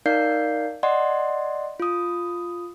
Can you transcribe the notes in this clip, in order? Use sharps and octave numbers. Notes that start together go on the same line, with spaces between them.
D#4 A#4 D5 F5 G6 C7
D5 D#5 F#5 C6
F4 D#6